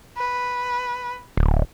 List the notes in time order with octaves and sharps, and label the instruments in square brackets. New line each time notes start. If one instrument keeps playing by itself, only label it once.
[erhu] B4
[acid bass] D1